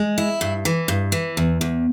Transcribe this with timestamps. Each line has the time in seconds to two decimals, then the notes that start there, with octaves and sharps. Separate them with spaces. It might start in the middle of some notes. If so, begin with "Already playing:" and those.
Already playing: G#3
0.18 E4
0.41 G2
0.65 E3
0.88 G2
1.12 E3
1.37 E2
1.61 E2